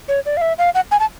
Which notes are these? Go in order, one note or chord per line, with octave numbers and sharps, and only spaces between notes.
C#5
D5
F5
E5
F5
F#5
G#5
A5